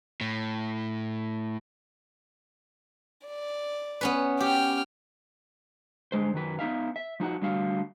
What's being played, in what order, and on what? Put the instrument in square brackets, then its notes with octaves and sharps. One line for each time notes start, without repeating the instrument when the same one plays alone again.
[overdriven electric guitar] A2
[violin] D5
[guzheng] B3 C#4 B4
[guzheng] G4 [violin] G5 F6
[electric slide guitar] G2 D3 G#3 C5
F#2 D#3 F#3 B4
B3 D#4 E5 F5
E5
F3 D#4 F#4 F#5
D3 G3 A3 F#4 F5